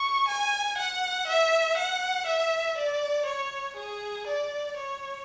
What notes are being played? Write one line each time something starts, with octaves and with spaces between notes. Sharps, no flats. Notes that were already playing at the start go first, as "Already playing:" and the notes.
Already playing: C#6
G#5
F#5
E5
F#5
E5
D5
C#5
G#4
D5
C#5